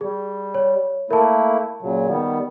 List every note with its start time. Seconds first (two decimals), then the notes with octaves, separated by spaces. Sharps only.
0.01 G3 G#4
0.55 C#5
1.11 A3 A#3 E4 A#4 A5
1.82 A#2 C#3 F#3
2.08 D#3 G3 B3